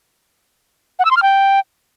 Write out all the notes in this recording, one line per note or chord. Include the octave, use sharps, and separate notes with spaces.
F#5
E6
C6
F6
G5